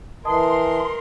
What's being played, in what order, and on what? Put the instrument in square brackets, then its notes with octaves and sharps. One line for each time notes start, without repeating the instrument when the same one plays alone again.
[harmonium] E3 [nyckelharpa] A#4 [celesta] D#5 A5 D#6 [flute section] C6